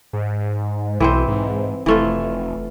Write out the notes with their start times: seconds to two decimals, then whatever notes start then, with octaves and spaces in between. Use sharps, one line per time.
0.13 G#2
1.00 B1 E3 C4 C5
1.28 G#2
1.86 F1 E3 A3 F4